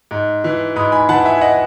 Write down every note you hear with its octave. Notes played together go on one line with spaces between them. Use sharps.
G#2
E3
G#2 B5 D#6
G#5 B5
E3 F#5 A5
E5 G#5
G#5
D#5 F#5